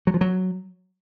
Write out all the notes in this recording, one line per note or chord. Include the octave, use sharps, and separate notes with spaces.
F#3
F3
F#3